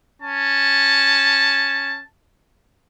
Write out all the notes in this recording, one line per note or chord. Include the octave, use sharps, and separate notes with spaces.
C#4 A5